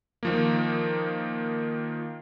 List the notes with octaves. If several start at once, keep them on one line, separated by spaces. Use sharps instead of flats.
D#3 F3 A#3